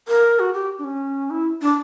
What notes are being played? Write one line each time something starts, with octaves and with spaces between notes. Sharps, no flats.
A#4
F#4
G4
D4
C#4
E4
D4